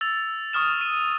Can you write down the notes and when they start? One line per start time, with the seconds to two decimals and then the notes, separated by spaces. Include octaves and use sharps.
0.01 E6 A6 F7
0.53 C#6 D#6 F6 E7
0.81 D#7